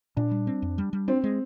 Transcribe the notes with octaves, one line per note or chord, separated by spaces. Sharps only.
A#2 D4
G3
C4
F2
G3
G3
C4 D4
G#3